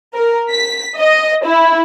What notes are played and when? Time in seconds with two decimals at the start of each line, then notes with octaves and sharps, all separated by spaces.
0.15 A#4
0.50 B6
0.97 D#5
1.44 E4